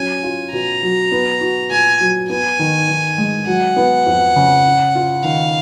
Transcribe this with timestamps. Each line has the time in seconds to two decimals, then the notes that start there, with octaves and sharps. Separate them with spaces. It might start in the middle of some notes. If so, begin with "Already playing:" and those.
Already playing: F#3 C#4 G#5
0.23 F4
0.53 B2 A#5
0.82 F#3
1.12 B3
1.41 F#4
1.70 A#2 G#5
2.00 F#3
2.29 B3 G#5
2.59 D#3
2.89 D#3
3.18 G#3
3.47 F#3 F#5
3.76 B3
4.07 F2
4.36 C#3
4.65 C#4
4.95 F4
5.24 D#3 F5